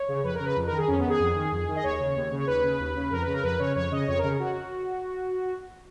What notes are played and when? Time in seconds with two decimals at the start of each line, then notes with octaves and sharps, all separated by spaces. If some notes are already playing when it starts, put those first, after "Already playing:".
Already playing: C#5
0.08 C#3
0.24 F2 B4
0.34 A#4
0.40 C#3
0.45 B4
0.56 F2
0.66 A#4
0.72 D#3
0.78 G#4
0.88 F2 C#4
0.98 B3
1.04 D#3
1.09 G#4
1.20 F2
1.36 D#3
1.52 F2
1.68 D#3
1.76 D#5
1.83 D#2 C#5
2.00 C#3
2.16 D#2
2.32 C#3
2.39 C#5
2.47 D#2 B4
2.64 C#3
2.80 D#2
2.96 C#3
3.11 F2 A#4
3.22 B4
3.27 C#3
3.33 A#4
3.43 F2 B4
3.59 C#3 C#5
3.75 F2 C#5
3.91 C#3 D#5
4.07 F2 C#5
4.18 A#4
4.24 C#3
4.39 F#4